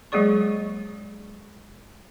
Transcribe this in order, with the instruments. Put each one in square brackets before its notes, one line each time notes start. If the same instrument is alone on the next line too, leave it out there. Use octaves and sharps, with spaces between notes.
[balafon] F#3 G#3 A#3 G#4 D5 C#6